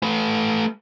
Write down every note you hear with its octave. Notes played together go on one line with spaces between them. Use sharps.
A3 B4